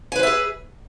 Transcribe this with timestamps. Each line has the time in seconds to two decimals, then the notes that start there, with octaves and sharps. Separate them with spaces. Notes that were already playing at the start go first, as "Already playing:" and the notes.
0.12 G#5
0.16 B4
0.19 C5
0.23 E5
0.27 G#4